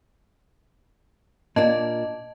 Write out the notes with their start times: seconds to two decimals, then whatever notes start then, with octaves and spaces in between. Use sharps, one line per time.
1.56 A#2 A#3 D4 D#5 A5